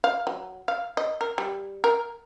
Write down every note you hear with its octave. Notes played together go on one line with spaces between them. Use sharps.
F5
F#3
F5
D#5
A#4
G3
A#4